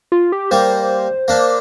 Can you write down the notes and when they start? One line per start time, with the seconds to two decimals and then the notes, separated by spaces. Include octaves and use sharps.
0.12 F4
0.32 G4
0.51 G3 A#3 C5
1.28 A#3 D4